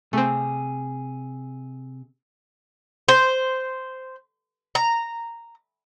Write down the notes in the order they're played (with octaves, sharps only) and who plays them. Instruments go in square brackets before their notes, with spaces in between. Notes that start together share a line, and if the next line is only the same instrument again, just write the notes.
[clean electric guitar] C3 G#4 [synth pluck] A3 C4
[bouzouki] C5
A#5